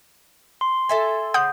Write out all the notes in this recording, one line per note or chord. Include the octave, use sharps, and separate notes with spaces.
C6
A4 E5 G#5
A2 C#3 F#5 D#6 G6